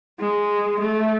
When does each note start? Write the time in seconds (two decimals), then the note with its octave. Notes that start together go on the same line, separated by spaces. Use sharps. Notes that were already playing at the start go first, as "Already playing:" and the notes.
0.20 G#3
0.80 A3